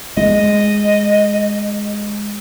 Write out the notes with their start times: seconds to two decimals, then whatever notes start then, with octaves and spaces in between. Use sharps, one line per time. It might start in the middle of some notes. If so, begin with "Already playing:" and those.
0.17 G#3 D#5